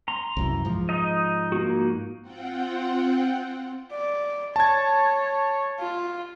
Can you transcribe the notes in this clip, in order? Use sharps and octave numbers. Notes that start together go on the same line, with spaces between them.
A#5 C6
C2 F#2 E3
G#2 F3
D#4 D#5
A#3 D#4 F#4
C4 F4 F#5 G5
D5
C#5 A5 G#6
F4